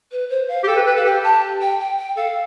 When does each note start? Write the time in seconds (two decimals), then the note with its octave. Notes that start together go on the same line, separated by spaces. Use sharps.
0.11 B4
0.30 C5
0.48 F5
0.64 G4
0.67 A4 G5
0.76 B4
0.87 B4
0.96 A4 F5
1.05 G4 G5
1.23 A5
1.61 G5
1.80 G5
1.98 G5
2.17 A4 F5